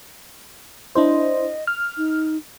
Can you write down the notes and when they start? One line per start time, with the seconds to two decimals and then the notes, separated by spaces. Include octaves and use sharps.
0.95 D4 E4 C5 D#5
1.67 F6
1.97 D#4